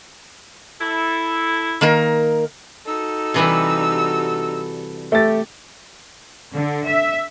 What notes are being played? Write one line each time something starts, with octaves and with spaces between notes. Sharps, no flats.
E4 A4
D#3 A#3 A#4
D#4 F#4 A4 E6
C3 E3 G3
A3 G4 A6
D3
E5